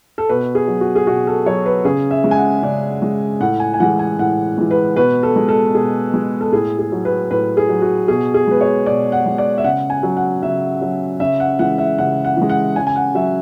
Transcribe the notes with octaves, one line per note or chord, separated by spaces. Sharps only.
A4
B2 B4
G#4
F#3
F#4
G#4
B2 F#4
A4
F#3 C#5
B4
C#3 G#4
E5
G#3
G#5
F#5
C#3 D5
G#3
A2 F#5
G#5
G#5
E3 G#3 F#5
G#5
A2 F#5
E3 G#3
B4
B2 B4
A4
G#3
A4
B2 G#4
G#3
A4
A2 G#4
G#4
F#3
B4
A2 B4
G#4
F#3
F#4
B2 G#4
G#4
G#3 B4
C#5
B2 D5
F#5
G#3
D5
E5
C#3 F#5
G#5
F#3
F#5
C#3 E5
F#3
C#3 E5
F#5
E3 G#3 F#5
E5
C#3 F#5
F#5
E3
G#3
F#5
C#3 G#5
G#5
F#5
F#3 E5